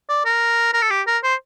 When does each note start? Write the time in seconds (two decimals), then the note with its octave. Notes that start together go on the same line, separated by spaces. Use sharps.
0.09 D5
0.25 A#4
0.73 A#4
0.82 A4
0.90 G4
1.07 A#4
1.23 C5